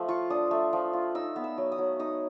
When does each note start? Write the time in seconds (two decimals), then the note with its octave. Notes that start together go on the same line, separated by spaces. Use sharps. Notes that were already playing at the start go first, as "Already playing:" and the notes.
Already playing: F3 A3
0.08 F4 C#6
0.30 D4 D#6
0.51 A3
0.73 F3
0.93 F4
1.15 D#4 E6
1.36 B3
1.44 E6
1.58 F#3
1.72 D#6
1.78 F#3
1.99 D#4 D#6